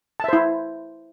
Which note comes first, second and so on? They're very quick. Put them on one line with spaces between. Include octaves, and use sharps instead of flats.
A5 E5 C5 E4